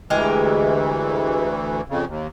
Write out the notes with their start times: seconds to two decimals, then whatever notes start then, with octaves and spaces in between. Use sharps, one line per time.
0.10 D2 E3 G#3 G4 A#4
1.89 F2 C#3
2.07 D#2